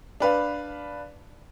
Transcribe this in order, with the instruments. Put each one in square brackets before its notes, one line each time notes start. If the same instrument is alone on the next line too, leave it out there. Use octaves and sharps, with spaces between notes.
[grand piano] D4 B4 F5